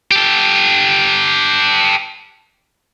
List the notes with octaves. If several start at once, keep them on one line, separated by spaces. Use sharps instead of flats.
G4 A4